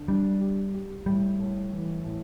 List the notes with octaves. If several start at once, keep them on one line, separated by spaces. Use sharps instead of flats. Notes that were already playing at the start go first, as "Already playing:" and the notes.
Already playing: D3
G3 D4
G4
G4
A2 G3
A2
E3
A2